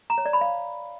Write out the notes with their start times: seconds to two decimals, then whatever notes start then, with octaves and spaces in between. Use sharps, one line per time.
0.10 A#5
0.18 C#5
0.25 D5
0.33 B5
0.41 F5